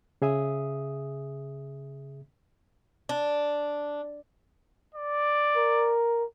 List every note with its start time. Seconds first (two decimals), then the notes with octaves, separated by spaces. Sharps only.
0.22 C#3 G#4 E5 D#6
3.09 D4
4.95 D5
5.56 A#4